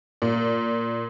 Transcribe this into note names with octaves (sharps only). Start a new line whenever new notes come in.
A#2